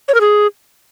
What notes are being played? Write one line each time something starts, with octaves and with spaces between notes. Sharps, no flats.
C#5
A#4
G#4